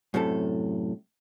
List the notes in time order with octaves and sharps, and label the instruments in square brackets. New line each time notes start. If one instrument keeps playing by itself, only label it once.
[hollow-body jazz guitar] F#2 A2 C3 A4